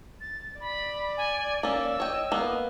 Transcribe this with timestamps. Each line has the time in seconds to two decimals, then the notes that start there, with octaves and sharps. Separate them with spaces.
0.21 A6
0.60 D5 B5
1.17 G#5
1.63 A#3 C#4 E6
2.00 C#5 D#5 G5
2.32 A#3 B3